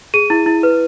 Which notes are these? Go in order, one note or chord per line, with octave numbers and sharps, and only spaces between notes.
G#4 D#7
E4
E4
B4